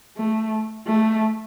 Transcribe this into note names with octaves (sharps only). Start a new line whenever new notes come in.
A3
A3